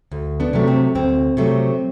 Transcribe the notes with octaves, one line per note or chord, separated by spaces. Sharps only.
D2
B3 D4
C3 F#3 A3
C4
D2 C4
C3 F#3 A3